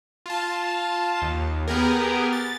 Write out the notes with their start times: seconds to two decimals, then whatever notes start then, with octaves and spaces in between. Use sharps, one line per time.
0.26 F4 A5
1.22 D#2
1.68 B3 G4 G#4 A#4
2.33 A6